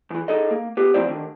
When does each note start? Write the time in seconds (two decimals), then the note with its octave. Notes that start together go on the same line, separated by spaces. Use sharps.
0.11 E2 E3
0.28 D#4 G#4 A4 D#5
0.51 A#3
0.77 B3 G4
0.94 F3 A#3 C4 E4 C5 D5
1.08 D#2 D3 D#3